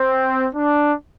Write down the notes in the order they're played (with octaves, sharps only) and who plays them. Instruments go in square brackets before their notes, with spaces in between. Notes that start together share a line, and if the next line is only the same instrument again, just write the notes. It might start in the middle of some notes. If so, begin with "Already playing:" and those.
Already playing: [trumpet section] C4
D4